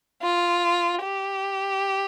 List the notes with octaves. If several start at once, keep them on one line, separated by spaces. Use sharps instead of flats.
F4
G4